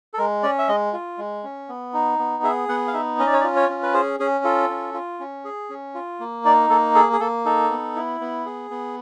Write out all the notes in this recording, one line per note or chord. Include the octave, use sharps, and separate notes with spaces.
A4
G#3 A#4
C#4 D5
E5
G#3 D#5
F4
G#3
C#4
B3
D#4
B3
G#4 E5
B3 F#5
F5
D#4 E5
C#4 D#5
D5
C#5
D5
F4
C#5
C#4
B4
G#4 C5
C#4 G#4
F4 A4
C#4
F4
C#4
G#4
C#4
F4
A#3
D#4 D5
A#3 A4
G#4 A4
G#4
A#3 A4
D#4 A4
B3
E4
B3
G#4
B3